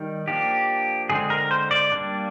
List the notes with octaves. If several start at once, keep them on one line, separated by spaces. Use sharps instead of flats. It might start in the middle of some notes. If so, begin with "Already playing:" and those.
Already playing: D#3 G3
F3 A#3 D4 G4
D3 G#3 C4 G#4
A#4
C5
D5
G3 A#3 D4